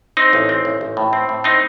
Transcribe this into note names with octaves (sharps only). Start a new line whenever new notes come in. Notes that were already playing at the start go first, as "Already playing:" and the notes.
C4 D#4
A1
C4
A1
A1
A2
C4
A2
C4 D#4